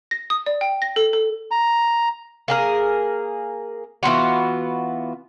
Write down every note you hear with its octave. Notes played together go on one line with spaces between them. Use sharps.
A#6
D#6
D5
G5
A#6
A4
A4
A#5
A#3 G#4 A#4
E3 B3 F4 F#4